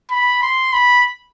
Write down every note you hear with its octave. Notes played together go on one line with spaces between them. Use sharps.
B5
C6
B5